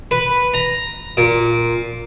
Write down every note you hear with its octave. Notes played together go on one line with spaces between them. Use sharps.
B4
A#5
A#2